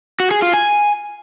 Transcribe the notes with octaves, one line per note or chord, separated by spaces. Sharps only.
F#4
G#4
F4
G#5